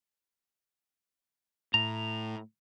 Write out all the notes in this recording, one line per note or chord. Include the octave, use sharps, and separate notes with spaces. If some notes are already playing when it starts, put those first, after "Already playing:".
A2 A#5